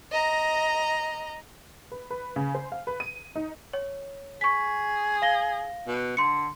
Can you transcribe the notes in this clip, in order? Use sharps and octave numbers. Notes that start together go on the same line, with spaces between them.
D#5 A#5
B4
B4
C#3
C5
F5
B4
D#7
D#4
C#5
G#4 C#6 B6
F5 A#6 G7
B2
D3 C6 C#7